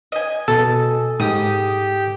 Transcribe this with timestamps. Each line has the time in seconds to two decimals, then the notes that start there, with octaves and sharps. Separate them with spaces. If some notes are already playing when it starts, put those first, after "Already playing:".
0.12 D#5 G#5
0.48 B2 A4
1.20 G#2 G4 G5 D#6